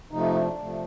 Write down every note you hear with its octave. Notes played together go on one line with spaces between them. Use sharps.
C3 F3 A3 D#4
D4
C3 F3 A3